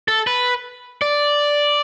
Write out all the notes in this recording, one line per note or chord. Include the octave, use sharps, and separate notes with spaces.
A4
B4
D5